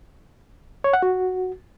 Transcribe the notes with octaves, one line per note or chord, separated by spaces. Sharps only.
C#5
F#5
F#4